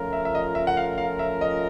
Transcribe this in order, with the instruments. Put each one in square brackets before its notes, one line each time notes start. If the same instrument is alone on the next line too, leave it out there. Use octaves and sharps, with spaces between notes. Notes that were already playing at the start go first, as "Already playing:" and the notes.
Already playing: [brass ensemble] F3 A3 C#4 F4 A#4
[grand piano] E5
E5
D#5
E5
F#5
F5
F5
E5
D#5